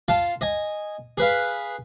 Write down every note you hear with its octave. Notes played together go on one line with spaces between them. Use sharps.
F4 F5 A5
D#5 G#5
G#4 B4 F5